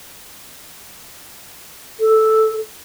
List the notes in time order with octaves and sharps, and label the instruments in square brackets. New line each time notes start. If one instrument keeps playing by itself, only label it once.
[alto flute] A4